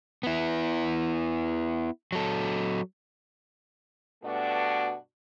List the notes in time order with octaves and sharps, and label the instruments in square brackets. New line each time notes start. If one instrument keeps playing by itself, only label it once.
[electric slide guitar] B3 E4
F#3 A4
[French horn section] G2 B2 A3 D4 F#4